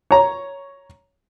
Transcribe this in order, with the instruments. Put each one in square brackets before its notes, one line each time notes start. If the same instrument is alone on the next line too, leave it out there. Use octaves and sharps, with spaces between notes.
[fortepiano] C#5 A#5